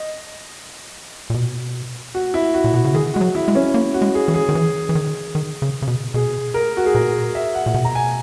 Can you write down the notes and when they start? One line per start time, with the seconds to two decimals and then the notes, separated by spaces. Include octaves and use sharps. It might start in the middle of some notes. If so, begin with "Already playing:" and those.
Already playing: D#5
1.30 A#2
1.34 B2
2.15 F#4
2.34 E4
2.54 F#4
2.64 A#2
2.74 B2 F#4
2.84 C#3
2.94 D#3 G#4
3.14 G#3 F#4
3.21 F#3
3.35 E4
3.48 G#3
3.55 C#4
3.74 A#3
3.94 F#4
4.02 G#3
4.15 G#4
4.28 E3
4.34 G#4
4.49 D#3
4.55 E3
4.89 E3
4.95 D#3
5.35 D#3
5.62 C#3
5.82 C#3
5.87 B2
6.14 B2 G#4
6.54 A#4
6.77 F#4
6.86 G#4
6.95 A#2 A#4
7.35 E5
7.55 F#5
7.66 A#2
7.74 B2 F#5
7.85 A#5
7.95 G#5